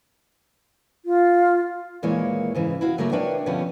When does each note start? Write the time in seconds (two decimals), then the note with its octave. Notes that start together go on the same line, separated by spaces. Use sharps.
1.05 F4
2.03 D#2 A#2 E3 G#3 A#3 C#5
2.55 G#2 C#3 E3
2.81 E4 F#4 F5
2.98 C#3 F#3 A3 A#3 A#4 E5
3.12 D4 A#4 B4 C#5 E5 G5
3.46 B2 D3 F3 B3 C#4 G4